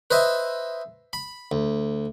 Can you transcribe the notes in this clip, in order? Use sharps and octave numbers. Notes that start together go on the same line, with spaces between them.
B4 C5 D#5 E5
B5
D2